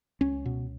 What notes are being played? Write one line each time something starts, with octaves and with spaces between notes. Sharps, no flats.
C#2 C#4
B2